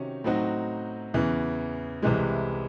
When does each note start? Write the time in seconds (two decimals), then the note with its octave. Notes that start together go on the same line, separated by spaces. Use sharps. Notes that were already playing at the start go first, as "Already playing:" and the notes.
Already playing: C3 D#3 F#3 C#4
0.24 A2 F#3 C4 D#4 F#4
1.14 E2 C#3 E3
2.02 C2 C3 E3 G#3